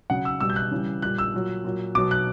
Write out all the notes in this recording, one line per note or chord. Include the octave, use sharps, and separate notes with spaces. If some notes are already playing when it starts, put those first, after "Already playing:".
C#3 F#3 F#5
E6
B2 G3 E6
G6
F#6
C#3 E3 G3
A#2 G3 F#6
E6
A#2 F#3
A#2 F#3
B2 F#3 D6
F#6